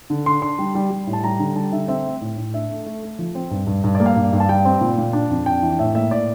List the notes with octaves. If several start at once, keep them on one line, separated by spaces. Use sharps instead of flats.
D3
D4 C6
D4 C6
G3
G3
G3
A2
A5
G3 A#5
D3
G3 A5
D3 E5
C4 E5
A3
A2
A2
D4 E5
A3
A3
A3
F3
C4
G2
G2
G2
D5
A#3
F5
G2
G2
A5
G3 G5
C4
A#2
A#2
D4
F2
D4 G5
E3
A2 E5
A#3 E5
A2 D5